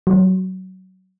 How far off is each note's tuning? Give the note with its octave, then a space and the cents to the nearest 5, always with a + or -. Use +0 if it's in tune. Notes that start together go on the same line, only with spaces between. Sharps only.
F#3 +15